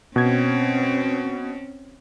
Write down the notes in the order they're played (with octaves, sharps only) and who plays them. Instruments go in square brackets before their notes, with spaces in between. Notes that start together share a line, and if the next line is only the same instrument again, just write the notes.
[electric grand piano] B2 G#6 [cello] C4 C#4